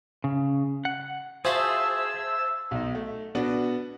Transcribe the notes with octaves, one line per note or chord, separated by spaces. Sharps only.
C#3
F#5
F4 F#4 G#4 C5 E5 F5 A5 E6
B1 D#4
A3
B2 B3 D4 F#4